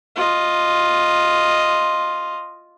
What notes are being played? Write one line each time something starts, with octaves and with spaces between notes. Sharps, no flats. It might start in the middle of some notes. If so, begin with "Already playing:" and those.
F4 D#5